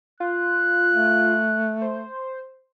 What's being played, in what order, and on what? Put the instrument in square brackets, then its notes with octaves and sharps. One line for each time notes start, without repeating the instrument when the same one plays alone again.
[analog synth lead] F4 [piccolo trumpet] F#6
[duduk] A3
[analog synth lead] C5